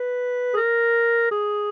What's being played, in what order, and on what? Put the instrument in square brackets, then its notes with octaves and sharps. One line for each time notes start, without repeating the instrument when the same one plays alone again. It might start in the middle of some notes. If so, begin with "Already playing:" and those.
Already playing: [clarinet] B4
G#4
A#4
G#4